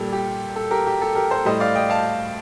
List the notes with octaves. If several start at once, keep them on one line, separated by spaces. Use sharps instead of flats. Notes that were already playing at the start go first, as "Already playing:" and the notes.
Already playing: A#2 G3 A4
G4
A4
G4 A#4
G4
A4
G4 A#4
A4 C5
A2 G3 C5 D#5
D5 F5
D#5 G5
F5 A5